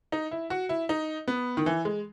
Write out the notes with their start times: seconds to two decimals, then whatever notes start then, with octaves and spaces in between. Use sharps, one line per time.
0.12 D#4
0.31 E4
0.50 F#4
0.69 E4
0.89 D#4
1.28 B3
1.57 D#3
1.66 E3
1.85 G#3